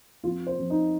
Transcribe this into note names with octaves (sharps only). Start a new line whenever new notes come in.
F2 F4
C5
F2
D#4